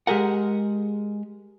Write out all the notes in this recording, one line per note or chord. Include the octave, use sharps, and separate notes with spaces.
G#3 G4 G#4 A#4 F#5